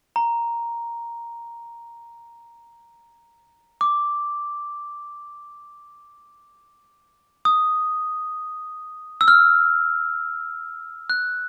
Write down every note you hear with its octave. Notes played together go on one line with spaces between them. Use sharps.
A#5
D6
D#6
E6
F6
F#6